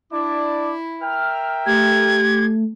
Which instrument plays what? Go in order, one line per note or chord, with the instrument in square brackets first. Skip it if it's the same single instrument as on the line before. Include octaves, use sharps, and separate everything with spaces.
[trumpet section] D4 D5 D6 [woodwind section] E4
[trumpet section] A#4 E5 G5 [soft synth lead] F6
[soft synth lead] A3 [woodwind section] G4 [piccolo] G#6